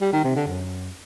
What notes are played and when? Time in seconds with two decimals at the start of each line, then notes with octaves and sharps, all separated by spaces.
0.01 G3
0.13 D#3
0.24 C3
0.36 D3
0.47 F#2